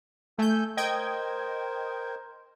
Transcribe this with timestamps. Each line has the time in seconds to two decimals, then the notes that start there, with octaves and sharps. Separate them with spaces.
0.38 A3 A4 G#5 E6 G6
0.77 A#4 C5 D#5 G5 G#6